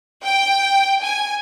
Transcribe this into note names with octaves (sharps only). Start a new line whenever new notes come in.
G5
G#5